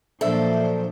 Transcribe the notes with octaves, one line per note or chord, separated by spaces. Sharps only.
A#2 F3 F#3 D4 A4 C5 E5